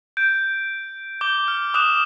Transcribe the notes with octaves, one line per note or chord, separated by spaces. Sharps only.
G6 D7
D6 G6 G7
F6
D6 D#6 F#6 E7